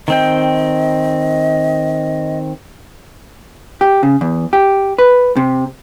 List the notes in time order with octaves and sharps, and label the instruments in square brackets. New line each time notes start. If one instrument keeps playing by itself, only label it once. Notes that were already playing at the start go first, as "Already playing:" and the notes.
[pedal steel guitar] D#3 C4 G5 [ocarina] D#5
[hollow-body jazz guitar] G4
C#3
E2
G4
B4
C3